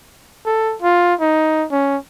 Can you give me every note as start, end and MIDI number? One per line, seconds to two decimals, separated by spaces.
0.46 0.76 69
0.82 1.15 65
1.20 1.66 63
1.71 1.97 61